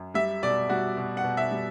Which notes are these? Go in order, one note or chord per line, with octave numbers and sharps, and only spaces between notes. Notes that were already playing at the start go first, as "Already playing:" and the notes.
Already playing: F#2
G3 E5
B2 D5
G3 F#4
B2
F#5
B2
E5
G3